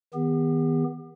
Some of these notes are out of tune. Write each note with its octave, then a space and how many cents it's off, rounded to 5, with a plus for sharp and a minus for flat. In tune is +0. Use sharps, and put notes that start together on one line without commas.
D#3 +30 B3 +0 G4 +40